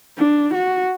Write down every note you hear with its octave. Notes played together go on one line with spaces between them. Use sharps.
D4
F#4